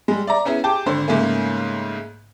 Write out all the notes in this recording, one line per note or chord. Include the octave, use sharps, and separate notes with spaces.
G3 G#3
D5 E5 A#5
B3 C#4 E4 G#4
G4 G#4 G5 A5 D6
G#1 D3 C5
G#2 C#3 A3 A#3 C#4